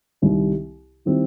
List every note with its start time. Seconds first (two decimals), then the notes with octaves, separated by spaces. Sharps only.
0.22 C2 C3 D#3 G3
1.05 D#3 G3 C4 E4